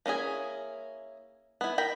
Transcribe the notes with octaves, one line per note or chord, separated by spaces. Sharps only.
A#3 C#4 E4 G#4
B3 E4
A#4 G5 B5